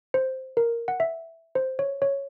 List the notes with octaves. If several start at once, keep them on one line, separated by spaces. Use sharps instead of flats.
C5
A#4
F#5
E5
C5
C#5
C#5